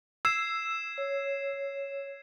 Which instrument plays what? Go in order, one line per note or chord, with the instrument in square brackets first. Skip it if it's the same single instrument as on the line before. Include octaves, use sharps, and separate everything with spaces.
[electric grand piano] E6 [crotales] G#6 C7 E7
[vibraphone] C#5